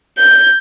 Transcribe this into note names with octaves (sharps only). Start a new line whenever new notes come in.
G6